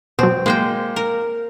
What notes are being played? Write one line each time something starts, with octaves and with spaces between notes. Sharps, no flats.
B2 F#3 C4
G#3 A#3 C5 G5
A#4